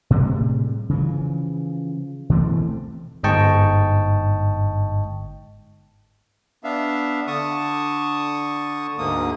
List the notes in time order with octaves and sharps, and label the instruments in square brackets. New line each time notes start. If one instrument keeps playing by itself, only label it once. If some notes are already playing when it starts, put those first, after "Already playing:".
[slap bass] A2 C3 G3 G#3
C#3 E3 F3
B2 E3 A3 C4
[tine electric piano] G1 G#2 D#5 G5 A5 C#6
[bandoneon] B3 D4 E5 F5
D3 A5 C#6 D#6
D2 G#2 D3 A#3 D#6